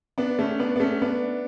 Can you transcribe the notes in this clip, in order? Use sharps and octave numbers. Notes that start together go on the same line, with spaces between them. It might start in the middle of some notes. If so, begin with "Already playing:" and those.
B3 D4
A3 C#4
B3 D4
B3
A3 C#4
B3 D4